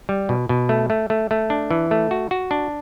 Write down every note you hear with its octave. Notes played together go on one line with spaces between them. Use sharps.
G3
B2
B2
A3
A3
A3
A3
D4
E3
A3
F#4
F#4
D4